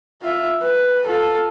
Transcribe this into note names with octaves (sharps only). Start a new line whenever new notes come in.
F4 E5
B4
F4 A4